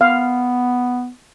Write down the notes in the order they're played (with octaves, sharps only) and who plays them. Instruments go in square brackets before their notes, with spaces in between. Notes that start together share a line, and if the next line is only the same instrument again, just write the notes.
[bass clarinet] B3 [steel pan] F5